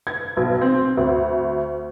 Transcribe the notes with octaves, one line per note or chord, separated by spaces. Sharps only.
G#6
B1
C4
D2